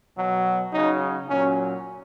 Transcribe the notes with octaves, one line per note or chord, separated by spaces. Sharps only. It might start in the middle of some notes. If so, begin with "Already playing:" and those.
B2 F#3
C#3 F#3 D#4
A#2 F#3 C#4